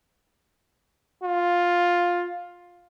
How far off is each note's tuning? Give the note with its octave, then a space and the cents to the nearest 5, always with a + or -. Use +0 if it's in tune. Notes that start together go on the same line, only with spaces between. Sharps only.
F4 +10